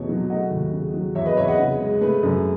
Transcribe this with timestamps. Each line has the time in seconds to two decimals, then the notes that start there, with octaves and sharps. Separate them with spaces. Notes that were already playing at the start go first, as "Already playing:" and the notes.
Already playing: E2 B2 A3 C#5
0.09 F#3
0.29 A3 D#5 F#5
0.51 D#2
0.73 C#3
0.94 F#3
1.15 E2 C#5 E5
1.26 B4 D#5
1.37 E2 C#5 E5
1.48 D#5 F#5
1.59 C#3
1.80 G#3
2.01 A3 G#4 B4
2.23 F#2